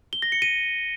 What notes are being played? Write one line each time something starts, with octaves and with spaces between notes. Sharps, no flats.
G7
A#6
C#7
D#7